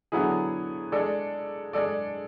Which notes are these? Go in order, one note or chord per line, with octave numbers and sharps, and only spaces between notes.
D3 F#3 B3 E4 G#4
G#3 D4 A4 D5
G#3 D4 A4 D5